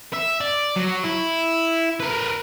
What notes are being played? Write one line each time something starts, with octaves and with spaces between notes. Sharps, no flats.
E5
D5
F#3
E4
A#4 B4